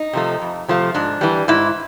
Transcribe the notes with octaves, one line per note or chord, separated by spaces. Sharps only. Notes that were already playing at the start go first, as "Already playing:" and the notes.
Already playing: D#4
C3 F3 A3
F2
C3 F3 A3
G#2 D4
E3 G3
G#2 E4